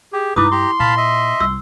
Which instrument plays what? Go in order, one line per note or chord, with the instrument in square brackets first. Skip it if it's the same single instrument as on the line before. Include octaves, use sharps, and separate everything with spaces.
[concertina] G4 [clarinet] G#4
[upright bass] G2 G#3 [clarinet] D#4 [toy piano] E4 D6 D#6 [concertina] B4
[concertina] G4 A#5 [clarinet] C6
[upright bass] A#2 [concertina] F5 A5 B5
[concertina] D#5 E5
[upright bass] C2 [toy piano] E6